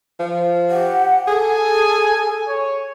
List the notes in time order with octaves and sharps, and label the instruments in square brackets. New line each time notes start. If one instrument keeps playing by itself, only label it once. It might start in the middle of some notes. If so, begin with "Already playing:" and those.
[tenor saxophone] F3
[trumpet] G4 [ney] F#5
[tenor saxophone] G#4 [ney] A4 [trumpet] G#5
[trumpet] C#5